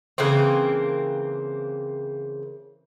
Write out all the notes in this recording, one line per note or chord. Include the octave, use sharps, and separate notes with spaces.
C#3 E3 A#3 C4